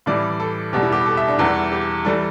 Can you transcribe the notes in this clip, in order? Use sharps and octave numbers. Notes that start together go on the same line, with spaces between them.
A2 E3 G3 D5
A4
E2 B2 G3 G4
E4
G4
A4
E5
D4
E2 E3 G3 E4
G4
E3 G3 A4